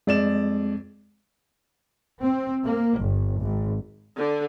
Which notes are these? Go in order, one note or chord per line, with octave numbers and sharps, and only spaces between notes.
F2 G#3 D5 E7
C4
A#3
G1
G#1
D3